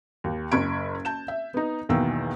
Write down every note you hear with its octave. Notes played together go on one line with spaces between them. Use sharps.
D#2
F#1 B5 C#6 G#6 D7
A5 G6 E7
E5
B3 D#4
B1 E2 D#3 E3 A#3 E6